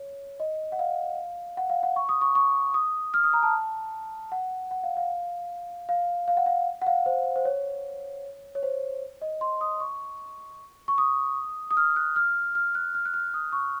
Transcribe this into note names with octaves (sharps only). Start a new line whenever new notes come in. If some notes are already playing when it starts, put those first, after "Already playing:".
Already playing: C#5
D#5
F#5
F5
F#5
F5
F#5
C#6
D#6
C#6
C#6
D#6
F6
D#6
A#5
A5
F#5
F#5
F5
F5
F5
F5
F#5
F5
F#5
F5
C5
C5
C#5
C#5
C5
D#5
C6
D#6
C#6
C#6
D#6
D#6
F6
F#6
F6
F6
F#6
F6
F#6
F6
D#6
C#6